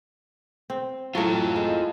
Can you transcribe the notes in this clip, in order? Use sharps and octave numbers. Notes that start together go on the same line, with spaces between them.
C4
A2 F#3 F4 A4
G#3